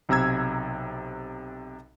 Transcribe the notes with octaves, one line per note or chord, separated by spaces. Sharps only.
B1 C3 A#5 E6 G#6